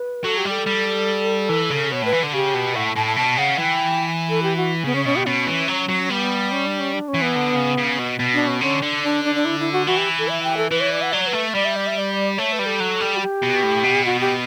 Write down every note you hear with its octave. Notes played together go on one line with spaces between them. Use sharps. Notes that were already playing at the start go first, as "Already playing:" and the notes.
Already playing: B4
F#3 A4
G4
G3
A4
G3
E3
C#3
B2 C#5
A2 B4
E3
D3
C#3 G4
B2
A2 F#5
A5
A2 A5
A5
B2 A5
C#3 F#5
E3 G5
A4
G4
F#4
C#3 B3
C#4
B2 C#4
G4
B2 C#4
E3
F#3
F#3
G3 B3
C#4
D4
C#4
D4
C#4
E3
B3
D3
C#3
C#3
B2
B2
D4
C#4
D3 C#4
D3 D4
D4
D4
D4
E4
E4
F#4
E3 F#4
G4
A4
E5
G5
A4
E3 B4
C#5
D5
F#5
F#3 D5
C#5
B4
A3
G3 D5
E5
D5
E5
D5
A3 C#5
B4
G3
A4
F#3
G3
F#4
G4
B2
A2
B2
F#4
G4